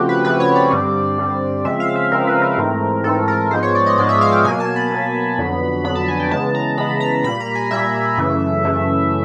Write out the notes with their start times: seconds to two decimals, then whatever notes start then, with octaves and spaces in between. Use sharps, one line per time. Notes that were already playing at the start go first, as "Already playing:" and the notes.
Already playing: C#3 F3 A3 C4 F#4 G4
0.09 B4
0.25 C#3 F3 A3 C4 B4
0.40 C#5
0.55 D5
0.71 G2 D3 G3 C4
1.18 G2 D3 G3 C4
1.65 C#3 F3 G#3 C4 E5
1.80 F5
1.96 E5
2.12 C#3 F3 G#3 C4 A#4
2.27 B4
2.42 A#4
2.57 G#2 E3 A3 C4
3.04 G#2 E3 A3 C4 A4
3.28 A#4
3.51 G#2 F3 G#3 B3 C5
3.63 C#5
3.75 D5
3.86 D#5
3.98 G#2 F3 G#3 B3 D5
4.09 E5
4.21 F5
4.32 G5
4.44 B2 F#3 A#3 G#5
4.60 A5
4.76 B5
4.91 B2 F#3 A#3
5.38 F2 D3 F#3 B3
5.84 F2 D3 F#3 B3 B5
5.95 A5
6.08 G#5
6.20 G5
6.31 C#3 E3 G#3 B3 A5
6.55 A#5
6.78 C#3 E3 G#3 B3 B5
7.01 A#5
7.24 A#2 G3 A#3 B5
7.40 A#5
7.55 G#5
7.71 A#2 G3 A#3 E5
8.18 F#2 C#3 E3 A3
8.64 F#2 C#3 E3 A3